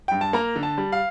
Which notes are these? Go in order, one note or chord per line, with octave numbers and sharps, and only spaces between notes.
G2 G5
A5
A#3 A#5
D3
A5
G3
F5